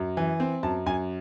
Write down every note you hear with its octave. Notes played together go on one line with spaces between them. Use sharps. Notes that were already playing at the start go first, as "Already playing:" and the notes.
Already playing: F#2
E3
C4
F#2 A5
F#2 G#5